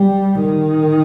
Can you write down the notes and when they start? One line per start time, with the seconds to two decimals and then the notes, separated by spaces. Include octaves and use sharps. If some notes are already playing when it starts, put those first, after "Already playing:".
Already playing: G3
0.40 D#3